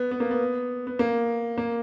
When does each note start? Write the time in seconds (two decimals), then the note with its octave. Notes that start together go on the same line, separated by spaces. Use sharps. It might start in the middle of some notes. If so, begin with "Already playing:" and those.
Already playing: B3
0.11 B3
0.20 A#3
0.31 B3
0.87 B3
0.99 A#3
1.58 A#3